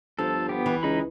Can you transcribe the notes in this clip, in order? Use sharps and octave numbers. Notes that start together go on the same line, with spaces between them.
G1 F3 A4
B3 G4
E3
C#2 D#4 B5